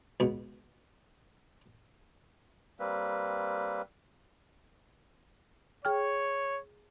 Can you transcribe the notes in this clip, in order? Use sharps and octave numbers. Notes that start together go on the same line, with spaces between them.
C#2 B2
G3 A#3 C4 B4
G#4 C#5 G5 F6